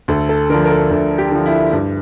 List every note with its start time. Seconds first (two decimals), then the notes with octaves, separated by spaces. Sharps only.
0.08 D2 A4
0.29 A4
0.49 D3 F3 A#4
0.65 A#4
0.70 A4
0.91 D2 A4
1.18 G4
1.32 D3 F3
1.46 E4
1.73 G2